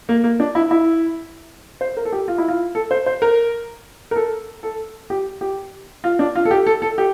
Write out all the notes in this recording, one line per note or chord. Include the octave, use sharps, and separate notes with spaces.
A#3
A#3
D4
E4
E4
C5
A#4
A4
G4
F4
E4
F4
A4
C5
C5
A#4
A#4
A4
A4
G4
G4
F4
D4
F4
A4
G4
A4
A4
G4